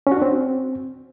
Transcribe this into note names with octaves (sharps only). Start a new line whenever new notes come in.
C#4
F#4
D4
C4